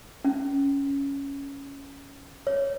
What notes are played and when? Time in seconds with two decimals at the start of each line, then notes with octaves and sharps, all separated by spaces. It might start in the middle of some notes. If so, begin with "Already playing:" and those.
0.25 C#4
2.47 C#5